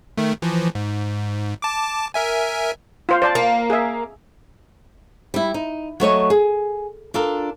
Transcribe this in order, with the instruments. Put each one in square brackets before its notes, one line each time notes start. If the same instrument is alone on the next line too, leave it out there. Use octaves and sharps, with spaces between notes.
[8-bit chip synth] D#3 A3
E3 F3
G#2
A5 D6
A#4 E5 G#5
[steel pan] F4 C5 F5
C5 D5 A5
[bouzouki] A#3
[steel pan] G#4 E5
[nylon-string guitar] G3 E4
D#4
F#3 A3 C#5 D#5
G#4
D4 F4 A4 A#4